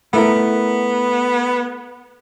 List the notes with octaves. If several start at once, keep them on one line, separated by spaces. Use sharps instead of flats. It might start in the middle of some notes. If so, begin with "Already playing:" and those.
A3 B3 E4 A#4